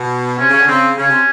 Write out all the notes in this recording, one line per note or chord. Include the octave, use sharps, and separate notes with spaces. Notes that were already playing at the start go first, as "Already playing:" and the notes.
Already playing: B2
C3 C#4
C#3 C#4
D3
C#3 C4
C#3 C#4
C3